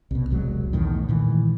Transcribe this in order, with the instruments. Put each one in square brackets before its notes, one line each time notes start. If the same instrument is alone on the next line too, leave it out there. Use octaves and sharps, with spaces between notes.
[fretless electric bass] C2 B2
E1 C2 F#3 G#3
B1 E2 A2 D#3
A#2 D#3 E3 G#3